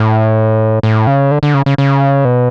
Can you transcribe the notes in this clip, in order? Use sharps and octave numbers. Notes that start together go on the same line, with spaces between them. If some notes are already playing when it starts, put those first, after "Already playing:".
Already playing: A2
A2
C#3
D3
D3
C#3
C#3
C#3
B2